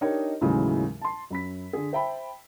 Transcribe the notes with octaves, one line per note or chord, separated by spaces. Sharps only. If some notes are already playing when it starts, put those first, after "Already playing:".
D4 D#4 G4 A#4 C#5 D#5
D#2 A2 C#3 E3 F#3 G#3
A5 C6
F#2 B5 B6
D3 G#4
C5 E5 G5 A5 B5